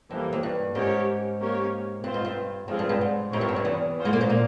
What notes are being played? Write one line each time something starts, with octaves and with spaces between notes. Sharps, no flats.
F2 E3 G3 A#3
F2
G2
G#2 C#4 G4 A#4 C#5
A#3 C#4 G4 A#4 C#5
G2 C4 F4 C5
G#2
G2
F2 F3 G#3 C4 F4 G#4
G2
G2
G#2
G#2 C4 E4 G4 A#4 C#5
G2
F2
G2
E2 E3
C#4 F4 C5
G#2 G#3
A#2 A#3
G#2 G#3
A#2 A#3